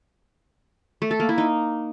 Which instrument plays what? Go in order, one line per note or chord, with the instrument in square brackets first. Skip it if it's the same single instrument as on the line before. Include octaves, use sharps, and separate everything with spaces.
[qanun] A3
A4
A#3
E4
D#4